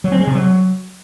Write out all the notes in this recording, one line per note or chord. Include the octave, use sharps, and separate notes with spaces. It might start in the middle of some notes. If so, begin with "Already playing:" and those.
F#3
C4
G#3
C3
F#3